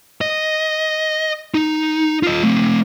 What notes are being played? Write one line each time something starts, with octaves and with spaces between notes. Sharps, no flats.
D#5
D#4
F4 D#5
A3 C4